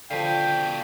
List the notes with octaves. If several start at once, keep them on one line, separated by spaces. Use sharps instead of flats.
B2 D3 F3 F5 G5 A5 B6 C7